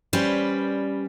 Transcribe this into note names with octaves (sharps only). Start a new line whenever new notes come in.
G3 C#4 B4 C5 D5